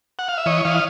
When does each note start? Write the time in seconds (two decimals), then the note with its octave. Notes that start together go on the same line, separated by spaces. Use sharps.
0.19 F#5
0.28 F5
0.38 E5
0.46 E3 C#5 D#5
0.65 E3 D#5 F5